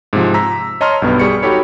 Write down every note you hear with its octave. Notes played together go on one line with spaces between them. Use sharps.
G#2 C3 F3
A#5 E6 B6
C#5 D#5 A5 A#5 C6 F6
B1 G2 B3
G3 G#4 C#6 C#7
D#4 F#4 G4 A4 C#5 B5